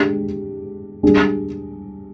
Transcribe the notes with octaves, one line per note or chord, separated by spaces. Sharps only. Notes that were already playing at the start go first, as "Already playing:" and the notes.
Already playing: G#3 D4 G4
G3 D4 G#4